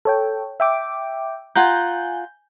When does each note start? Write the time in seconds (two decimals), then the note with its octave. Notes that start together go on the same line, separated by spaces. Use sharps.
0.05 A4 C#5 G5
0.60 E5 G5 D6
1.56 F4 F#5 G#5 A#5 G6